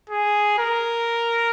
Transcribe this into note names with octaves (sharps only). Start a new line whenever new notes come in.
G#4
A#4